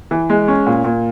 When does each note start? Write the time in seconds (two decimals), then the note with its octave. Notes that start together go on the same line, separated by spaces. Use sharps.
0.11 E3
0.30 G#3
0.48 C#4
0.66 A#2
0.84 A#2